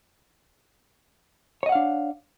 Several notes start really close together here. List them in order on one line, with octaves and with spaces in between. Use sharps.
C#5 D#5 F#5 F5 D4